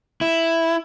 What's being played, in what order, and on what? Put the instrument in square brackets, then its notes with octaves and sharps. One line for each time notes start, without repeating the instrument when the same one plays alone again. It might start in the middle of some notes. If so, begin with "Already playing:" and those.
[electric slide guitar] E4